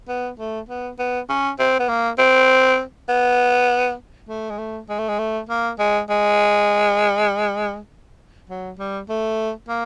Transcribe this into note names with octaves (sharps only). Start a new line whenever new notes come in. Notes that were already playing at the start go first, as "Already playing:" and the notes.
B3
A3
B3
B3
C#4
C4
B3
A#3
C4
B3
A3
G#3
A3
G#3
A3
G#3
A3
A#3
G#3
G#3
F#3
G3
A3
A#3